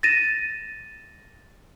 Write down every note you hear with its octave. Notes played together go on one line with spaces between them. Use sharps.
A6 A#6 D#7 E7